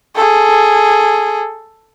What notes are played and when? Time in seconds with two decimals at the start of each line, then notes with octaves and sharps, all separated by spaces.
0.16 G#4 A4